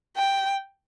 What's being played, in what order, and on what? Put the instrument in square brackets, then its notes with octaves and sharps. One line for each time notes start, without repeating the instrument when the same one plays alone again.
[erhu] G5